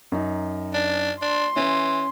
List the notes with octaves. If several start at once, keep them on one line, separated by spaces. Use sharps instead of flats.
F#2 D#4
D4
D4 C6
E3 C#4